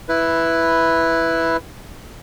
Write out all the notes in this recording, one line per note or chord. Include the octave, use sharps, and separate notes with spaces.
E4 B4